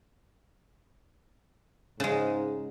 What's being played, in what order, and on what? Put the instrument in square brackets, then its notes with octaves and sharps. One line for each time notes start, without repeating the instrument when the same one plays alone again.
[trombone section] G#2 [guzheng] C#3 G#3